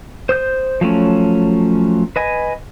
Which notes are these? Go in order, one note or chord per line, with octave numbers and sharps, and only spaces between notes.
C5 D#6 G6
F3 F#3 A3 C#4
B4 D#5 G#5